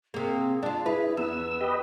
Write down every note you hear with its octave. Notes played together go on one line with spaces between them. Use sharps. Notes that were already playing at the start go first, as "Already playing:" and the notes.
C3 A#3 G#4
D4 F4 A5
E4 G#4 B4
E2 B3 E6
G4 B4 D#5